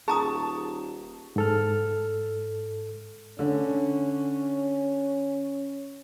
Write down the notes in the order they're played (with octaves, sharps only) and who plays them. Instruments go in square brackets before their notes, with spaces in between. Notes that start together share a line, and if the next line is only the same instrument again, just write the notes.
[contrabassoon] D#1 [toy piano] G#4 A#5 D#6 [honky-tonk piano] A5 C#6
[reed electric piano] G#2 A4 F6
[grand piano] D3 [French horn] C#4